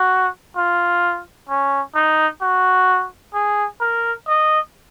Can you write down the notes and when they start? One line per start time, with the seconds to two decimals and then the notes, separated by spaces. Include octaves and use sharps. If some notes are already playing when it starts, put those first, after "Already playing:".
Already playing: F#4
0.56 F4
1.49 C#4
1.95 D#4
2.42 F#4
3.34 G#4
3.80 A#4
4.28 D#5